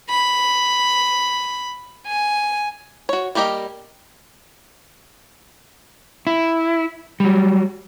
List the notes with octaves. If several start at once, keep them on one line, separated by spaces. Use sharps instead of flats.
B5
G#5
F#4 C#5
G3 A#3 G4 A#4 D#5
E4
F#3 G3